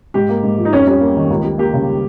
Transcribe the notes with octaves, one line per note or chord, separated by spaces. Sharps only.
G#2 G4
A#3
G#2
F3
D#4
F2 C#4
G3 C#4
A#3
D#3
C#2
G3
A#3 G4
C#3